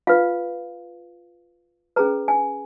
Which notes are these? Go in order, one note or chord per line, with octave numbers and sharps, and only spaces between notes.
F4 B4 F5
C#4 G#4 B4 A#5
G#5